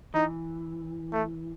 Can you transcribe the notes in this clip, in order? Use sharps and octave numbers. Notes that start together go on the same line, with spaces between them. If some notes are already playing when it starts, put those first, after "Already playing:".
E3 D#4
A3